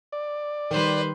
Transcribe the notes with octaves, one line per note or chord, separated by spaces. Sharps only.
D5
D#3 G3 B4 C5